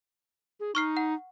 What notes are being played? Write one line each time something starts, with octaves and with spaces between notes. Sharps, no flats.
G#4
D#4 C#6 F6 C7
F#5